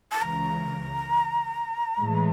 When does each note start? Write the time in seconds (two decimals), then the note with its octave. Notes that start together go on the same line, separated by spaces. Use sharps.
0.12 A5
0.21 C#2 C#3 E3 A#5
2.00 A2 E3 G#3